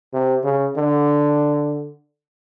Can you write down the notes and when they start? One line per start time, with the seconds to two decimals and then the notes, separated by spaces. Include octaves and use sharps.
0.13 C3
0.44 C#3
0.76 D3